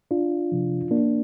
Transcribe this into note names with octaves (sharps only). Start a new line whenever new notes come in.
D4 F4
C3 F3
A#3 D4